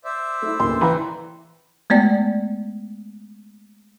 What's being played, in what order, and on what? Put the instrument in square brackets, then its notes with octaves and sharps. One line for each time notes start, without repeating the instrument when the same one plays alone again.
[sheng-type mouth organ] C5 D5 E5
[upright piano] A3 E4
[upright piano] D2 A#2 C#3 [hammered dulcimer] C6
[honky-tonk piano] E3 [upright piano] G5 A#5 B5
[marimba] G#3 A3 B3 D5